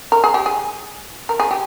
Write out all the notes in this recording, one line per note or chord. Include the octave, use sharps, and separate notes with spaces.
A#4
G#4
G4
G#4
A#4
G#4
G4